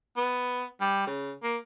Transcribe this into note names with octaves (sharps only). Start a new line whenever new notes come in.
B3
G3
C#3
A#3